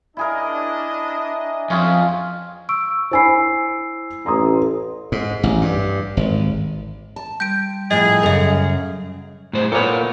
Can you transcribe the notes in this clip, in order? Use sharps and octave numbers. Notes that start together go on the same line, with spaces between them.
D4 E4 G#4 A#4 D#5
F2 C#4 F4 G#4
C#6 E6 D7
E4 C5 G#5 B5 E6 C7
A1 A#5 C6 D#6
G#2
A1
G2
G#1
A5
G3 G6 D7
A2 F3 G#4 D#5
F#2 C#3 A4 D#5
A2 C5
A#2 A#3 B3 A4 C#5